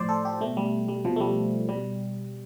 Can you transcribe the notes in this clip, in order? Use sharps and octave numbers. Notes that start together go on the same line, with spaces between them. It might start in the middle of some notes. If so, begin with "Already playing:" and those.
Already playing: A2 F3 C5 D5
A4
G4
B2 A3
G3
G3
B2 F3
A3
G3
B2 G3